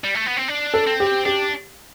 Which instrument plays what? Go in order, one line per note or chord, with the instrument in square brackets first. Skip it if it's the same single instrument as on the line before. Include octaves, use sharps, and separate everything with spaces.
[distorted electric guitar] G3
A3
B3
C4
D4
[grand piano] A4
[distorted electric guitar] C4
[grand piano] G4
[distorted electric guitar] D4 [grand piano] G4